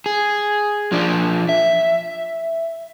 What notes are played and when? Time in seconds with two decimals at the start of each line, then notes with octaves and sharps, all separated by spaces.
0.06 G#4
0.92 F3 D4
1.49 E5